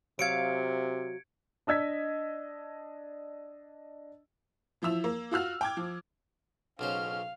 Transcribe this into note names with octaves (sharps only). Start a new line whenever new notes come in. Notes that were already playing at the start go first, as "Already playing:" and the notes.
C3 F#3 F5 G#6 C#7 D7
D4 D#5 E6 G#6 B6
E3 F3 E4 E6 F7
A#3
F4 F#4 E6 F6
G5 D6 G#6
F3
B1 C#3 C#4 C5 F5 F6